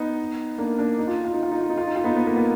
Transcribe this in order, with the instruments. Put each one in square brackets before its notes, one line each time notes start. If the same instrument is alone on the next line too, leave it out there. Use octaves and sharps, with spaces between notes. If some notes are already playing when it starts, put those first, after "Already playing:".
Already playing: [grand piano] B3 D#4
A#3 D4
A#3 D4
D#4
F4
D#4
F4
D#4
F4
D#4
F4
D#4
F4
D#4
F4
B3 D#4
B3
A#3
B3